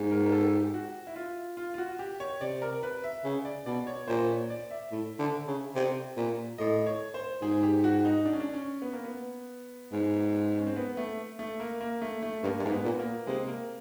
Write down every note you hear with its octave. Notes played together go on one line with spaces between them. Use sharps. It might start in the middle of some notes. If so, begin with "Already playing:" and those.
Already playing: G#2
A#4
A#4
A4
G4
F#4
E4
F4
F4
F4
F#4
G4
C#5
C3 D5
A#4
B4
E5
C#3
D5
B2 D5
C#5
A#2 C5
C#5
D5
E5
A2
D3
C#3
C3
A#2
A2 D#5
C#5
C5
G#2 G#4
G4
F#4
D#4
D4
C#4
D4
C#4
B3
A#3
B3
G#2
C#4
C4
B3
A3
A3
A#3
A#3
A3
A3
G2 A#3
G2
G#2
B3
A#2
A#3
C3 G#3
A#3